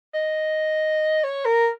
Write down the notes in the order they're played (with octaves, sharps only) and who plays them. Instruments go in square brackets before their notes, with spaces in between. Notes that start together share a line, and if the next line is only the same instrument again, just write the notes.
[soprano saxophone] D#5
C#5
A#4